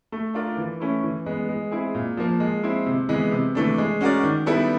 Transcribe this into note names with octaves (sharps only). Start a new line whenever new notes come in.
A3
D4 F4 A#4 D5
E3
A3 C#4 E4
E3
G#3 B3
G#3
C4 E4 G#4
A#2
F3 A#3
G#3
C4 E4
C3
E3 G#3 B3
C3
E3 A3 D4
G#3
C#4 F#4 A#4 D5
D#3
G3 B3 E4 A4